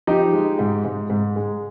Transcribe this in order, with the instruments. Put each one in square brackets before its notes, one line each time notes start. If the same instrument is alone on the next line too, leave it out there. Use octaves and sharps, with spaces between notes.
[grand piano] F3 D#4 G4
G#3
G#2
G#2
G#2
G#3